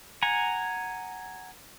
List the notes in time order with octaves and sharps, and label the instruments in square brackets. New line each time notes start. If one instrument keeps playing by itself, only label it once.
[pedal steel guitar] F#5 G#5 A#5